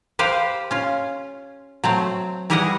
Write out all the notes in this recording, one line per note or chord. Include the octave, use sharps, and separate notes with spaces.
G4 B4 C5 F5
C#4 F4
F#3 A3 C4
E3 G3 E4 G#4 D#5 F#5